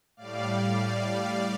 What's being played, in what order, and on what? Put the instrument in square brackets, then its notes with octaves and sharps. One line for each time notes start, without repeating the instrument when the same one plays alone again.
[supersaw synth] A2 G3 D5 F5